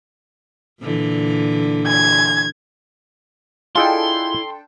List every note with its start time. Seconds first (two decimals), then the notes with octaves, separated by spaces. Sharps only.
0.82 A#2 D3 E3
1.88 G#6
3.75 D4 E4 F4 G#4 A4 D#5 G5 C6